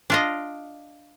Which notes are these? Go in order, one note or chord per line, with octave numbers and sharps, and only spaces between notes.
D4 F4 D#5